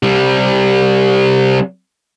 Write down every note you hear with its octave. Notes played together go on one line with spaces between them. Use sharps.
C3 G3